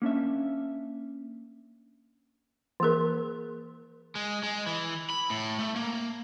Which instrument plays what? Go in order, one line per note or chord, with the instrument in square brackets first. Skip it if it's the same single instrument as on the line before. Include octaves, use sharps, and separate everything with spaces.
[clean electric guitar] A#3 C#4 D4 E5
[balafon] E3 A#3 G#4 A#4
[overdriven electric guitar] G#3
G#3
E3
B5
A2
A3
A#3